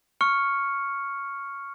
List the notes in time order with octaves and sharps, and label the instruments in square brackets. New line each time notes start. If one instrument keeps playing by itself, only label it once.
[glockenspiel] C#6 F6 C#7